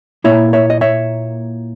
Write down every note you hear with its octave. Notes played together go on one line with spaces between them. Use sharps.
A#2 A#3 E4 C#5 E5
C#5 E5
D#5
C#5 E5